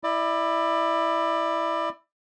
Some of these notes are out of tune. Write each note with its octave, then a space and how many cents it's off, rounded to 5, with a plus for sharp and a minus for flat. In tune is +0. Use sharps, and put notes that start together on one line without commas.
E4 +0 D5 +25